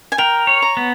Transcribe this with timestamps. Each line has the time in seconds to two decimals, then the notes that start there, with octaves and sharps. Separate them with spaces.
0.12 G#5
0.18 A#4 G5
0.47 C#5
0.62 A#5
0.77 B3